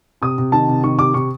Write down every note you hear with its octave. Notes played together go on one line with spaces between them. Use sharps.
C3 D#6
C3
D#3 A5
C3
D#3 C#6
C3 D6
C3 C#6